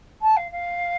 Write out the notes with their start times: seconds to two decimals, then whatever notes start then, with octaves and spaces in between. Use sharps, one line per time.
0.22 A5
0.36 F5
0.51 F5